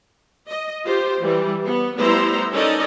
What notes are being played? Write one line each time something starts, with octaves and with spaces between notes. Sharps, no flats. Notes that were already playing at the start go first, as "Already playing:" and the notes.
D#5
F4 G4 C5
E3 G3
B3
G3 A3 B3 E4 C5 A#5
C#4 D#4 A4 A#4 D5 D#5